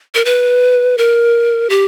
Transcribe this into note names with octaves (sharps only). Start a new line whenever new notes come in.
A#4
B4
A#4
G4